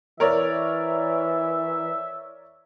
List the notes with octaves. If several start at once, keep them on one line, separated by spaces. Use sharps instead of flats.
E3 A#4 C#5 D5 E5